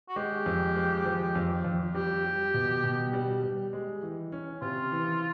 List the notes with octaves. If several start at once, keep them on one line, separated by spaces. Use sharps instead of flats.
F#4
G#3 G4
F2
G#3
F3
F2
F2
G3 G4
G3
B2
B2
G3
G3
G#3
E3
C#4
C3 F4
E3